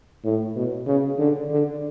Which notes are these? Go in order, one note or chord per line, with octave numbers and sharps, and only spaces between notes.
A2
B2
C#3
D3
D3